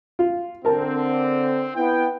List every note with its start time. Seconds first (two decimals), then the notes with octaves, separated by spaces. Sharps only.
0.19 F4
0.65 D3 C4 A#4 A5
1.75 B3 E4 G5